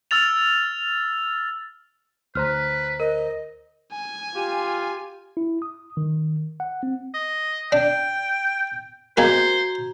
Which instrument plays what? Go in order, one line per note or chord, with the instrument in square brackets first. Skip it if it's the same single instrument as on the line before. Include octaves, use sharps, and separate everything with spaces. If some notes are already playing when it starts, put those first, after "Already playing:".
[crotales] E6 F6 A6 F7
[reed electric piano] D2 C5 A#5 [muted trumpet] B4 [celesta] F6
[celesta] A#4 [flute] D#5
[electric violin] G#5
[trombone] F4 [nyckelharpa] G4
[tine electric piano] E4
D#6
D#3
F#5
C4
[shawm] D#5
[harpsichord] D4 [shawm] G5
[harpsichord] G#3 A#3 G4 [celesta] F#4 A#5 G#6 [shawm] C5